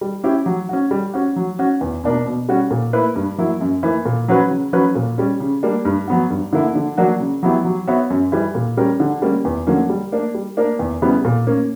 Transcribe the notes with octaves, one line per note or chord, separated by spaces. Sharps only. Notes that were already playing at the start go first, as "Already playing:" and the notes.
G3
C#4 E4 G4
F#3
C#4 F#4
G3
C#4 F#4
F#3
C#4 F#4
E2
B2 A#3 D4 A#4
B2
G3 C#4 F#4
A#2
A#3 E4 B4
G2
F#3 A#3 E4
F#2
E3 A#3
A#2
F#3 C#4 F#4 B4
C#3
F#3 C#4 F#4 B4
A#2
G3 C#4
C#3
G3 A#3 D4
G2
F#3 B3 F#4
G2
D3 A#3 E4
D3
F#3 A#3 D4 F#4
C#3
F#3 B3 E4 G4
F#3
B3 F#4 C#5 E5
F#2
E3 G3
A#2
G3 C#4 G4 A#4
D3
G3 A#3 C#4
E2
D3 F#3 A#3 C#4
G3
A#3 D4
G3
A#3 D4 A#4
E2
C#3 E3 G3 B3
A#2
A#3 C#4